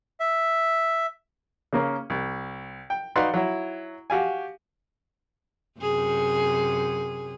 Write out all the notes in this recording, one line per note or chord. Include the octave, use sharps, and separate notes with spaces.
E5
C#3 A#3 C#4
C2
G5
D#4 F#4 B4 D5 F5 C6
F#3 E4
F#4 G4 F5 G#5
F#2 C3 G#4